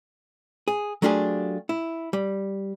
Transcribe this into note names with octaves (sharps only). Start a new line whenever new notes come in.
G#4
F#3 A3 D4 F4 G4 G#4
E4
G3